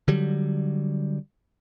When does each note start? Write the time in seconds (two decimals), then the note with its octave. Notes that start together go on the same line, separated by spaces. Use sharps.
0.08 D3 F#3 G3